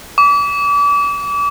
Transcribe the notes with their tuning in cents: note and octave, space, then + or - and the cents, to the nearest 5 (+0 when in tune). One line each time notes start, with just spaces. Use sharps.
D6 -35